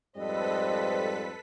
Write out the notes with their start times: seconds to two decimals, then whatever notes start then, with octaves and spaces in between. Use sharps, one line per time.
0.17 F2 G#2 G3 A4 B4 C5 D#5 B6